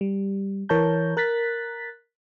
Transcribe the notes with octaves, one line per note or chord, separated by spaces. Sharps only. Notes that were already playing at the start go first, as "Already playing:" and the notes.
G3
E3 A#4 C#5 A5 A#5 G6
A#4 F#6 A6 B6